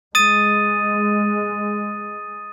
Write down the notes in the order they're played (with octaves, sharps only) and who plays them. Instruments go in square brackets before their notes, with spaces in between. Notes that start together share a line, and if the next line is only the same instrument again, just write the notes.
[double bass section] G#3 [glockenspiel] D#6 A6 D#7